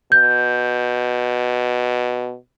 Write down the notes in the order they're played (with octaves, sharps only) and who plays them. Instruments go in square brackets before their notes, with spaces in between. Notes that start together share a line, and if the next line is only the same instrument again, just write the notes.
[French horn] B2 [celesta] G6